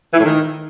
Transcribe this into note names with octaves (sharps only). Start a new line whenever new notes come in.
E3
A2
D#3